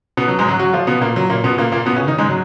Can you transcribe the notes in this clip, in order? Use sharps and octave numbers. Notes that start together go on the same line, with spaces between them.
B2 B3
F#3
G#2 G#3
F#3 F#4
F#3 F#4
F3 F4
B2 B3
A#2 A#3
F#3
A#2 A#3
B2 B3
A#2 A#3
A#2 A#3
B2 B3
C#3 C#4
D#3 D#4
G#2 G#3
F#3